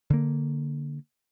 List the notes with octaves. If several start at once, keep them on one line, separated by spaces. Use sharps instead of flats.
D3 A#3